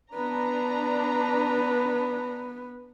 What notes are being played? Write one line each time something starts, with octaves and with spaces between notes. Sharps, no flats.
B3 D4 B4 A#5